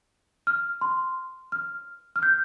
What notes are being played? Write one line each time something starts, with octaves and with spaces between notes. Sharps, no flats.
F6
C6
F6
F6
G6